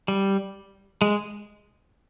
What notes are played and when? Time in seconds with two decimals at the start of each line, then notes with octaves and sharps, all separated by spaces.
0.08 G3
1.02 G#3